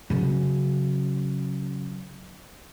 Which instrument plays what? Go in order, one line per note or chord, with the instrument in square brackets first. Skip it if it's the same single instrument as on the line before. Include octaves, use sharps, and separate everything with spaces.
[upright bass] C#3 F#3